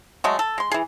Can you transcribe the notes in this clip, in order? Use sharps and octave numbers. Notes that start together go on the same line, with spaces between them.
F#3 G#3 A3
A4
G#3 C6
E3 G#4